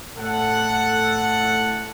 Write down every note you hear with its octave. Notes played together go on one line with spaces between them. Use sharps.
A2 A4 F#5